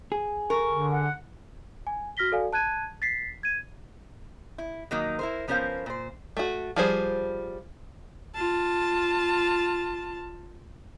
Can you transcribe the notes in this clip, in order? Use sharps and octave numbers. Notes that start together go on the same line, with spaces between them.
G#4
A#4 C#6
D3
F#5
G#5
F#4 F6 A#6 B6 G7
F#4 A4 D5 F5 G#5
A5 F#6 G#6 D#7
A6 B6 C7
G#6 D#7
E4
D#3 F#3 A#3 D#4
E4 A#4 C5
F3 B3 C#4 A#4 C5 F5
A#2 C5
A3 F#4
F3 G3 G#4 C5
F4 A5